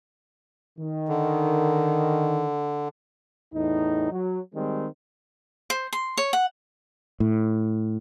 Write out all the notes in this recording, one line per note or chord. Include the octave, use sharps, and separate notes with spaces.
D#3
D3
E2 A2 D#4
F#3
D#3 G3 G#3 C4
C5
C6
C#5
F#5
A2